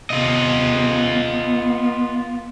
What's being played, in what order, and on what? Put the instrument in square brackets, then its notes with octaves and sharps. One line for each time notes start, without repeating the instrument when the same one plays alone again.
[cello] C3 B3 [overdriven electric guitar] F4 D#5
[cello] B3